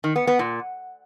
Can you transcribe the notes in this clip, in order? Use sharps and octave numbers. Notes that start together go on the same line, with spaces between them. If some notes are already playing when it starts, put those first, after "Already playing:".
D#3
B3
B3
A#2